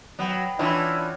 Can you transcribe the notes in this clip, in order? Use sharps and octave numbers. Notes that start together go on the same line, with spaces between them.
F#3 B3 G5
E3 C#4 D4 E4 F4